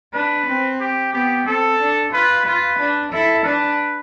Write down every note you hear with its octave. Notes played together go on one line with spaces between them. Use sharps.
D4 B4
C4
G4
B3 G4
C4 A4
D4
F4 B4
F4 B4
D4
E4 A4
D4 B4